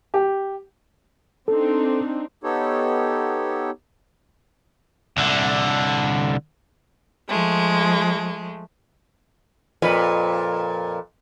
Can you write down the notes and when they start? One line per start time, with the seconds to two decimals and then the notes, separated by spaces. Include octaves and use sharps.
0.14 G4
1.48 C4 D4 D#4 A4
2.44 B3 D#4 G4 A4 C#5
5.17 C2 D3
7.29 F3 G#3 A3
9.82 F2 A#2 B4